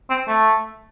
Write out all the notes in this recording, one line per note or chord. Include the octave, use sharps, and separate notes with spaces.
C4
A3